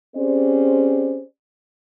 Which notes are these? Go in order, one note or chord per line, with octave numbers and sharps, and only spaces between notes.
C4 C#4 G4 G#4 C5 D5